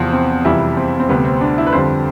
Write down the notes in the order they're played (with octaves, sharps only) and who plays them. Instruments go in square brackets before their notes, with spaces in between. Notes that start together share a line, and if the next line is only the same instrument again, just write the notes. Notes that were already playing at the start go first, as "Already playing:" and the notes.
Already playing: [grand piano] E2 C3 F3 C4
C4
F2 C3 E3 G3 E4
C4
C4
D2 C3 G3 B3
C4
D4
E4
B4
F2 D3 G3 C5